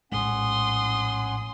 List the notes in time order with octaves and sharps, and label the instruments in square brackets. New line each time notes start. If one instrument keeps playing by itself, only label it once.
[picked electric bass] A#1 A2 G#3 [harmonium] C#4 F#5 [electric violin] C6 D#6